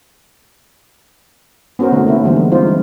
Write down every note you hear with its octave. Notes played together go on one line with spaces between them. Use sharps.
B3 C#4 F#4 A#4 C5
D3 A3 D#4
A#3 D#4 E4 F#4
D3 E3 G3 B3 C5
G#3
C4 D#4 F4 C5